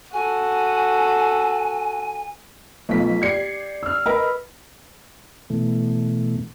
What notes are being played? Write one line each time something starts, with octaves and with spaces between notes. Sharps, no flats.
F#4 A4 G#5
B1 F3 A3 B3 B6
G4 D5 G#6 C7 C#7
E6 F6
A#4 B4 D#5
B2 E3 A3